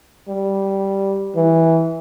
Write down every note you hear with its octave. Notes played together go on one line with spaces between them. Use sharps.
G3
E3